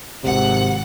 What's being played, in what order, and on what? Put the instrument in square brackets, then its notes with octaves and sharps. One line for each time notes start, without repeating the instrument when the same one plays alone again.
[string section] G#1 F#5 [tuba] C3